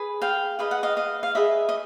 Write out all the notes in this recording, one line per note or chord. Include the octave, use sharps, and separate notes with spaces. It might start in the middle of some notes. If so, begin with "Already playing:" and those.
Already playing: G#4 B4
F5 G5
G#4 B4 D#5 F5
F#5
D#5 F5
D#5 F5
F5
G#4 B4 D#5 E5
D#5